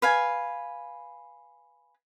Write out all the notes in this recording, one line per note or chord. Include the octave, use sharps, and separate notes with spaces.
B4 F5 G#5